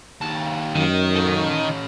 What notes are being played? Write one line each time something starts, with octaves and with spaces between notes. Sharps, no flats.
D#2 A5
F#2 D#3
C#4 A4